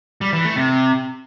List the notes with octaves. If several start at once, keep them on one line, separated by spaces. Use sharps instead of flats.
G3
E3
A3
C3